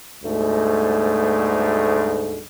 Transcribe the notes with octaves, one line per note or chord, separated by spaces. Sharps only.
D2 G#2 B2 G3 A3